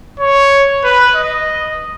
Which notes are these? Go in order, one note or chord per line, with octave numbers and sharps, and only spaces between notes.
C#5
B4
D#5